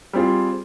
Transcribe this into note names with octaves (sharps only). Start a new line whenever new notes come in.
G3 C4 F4 G#4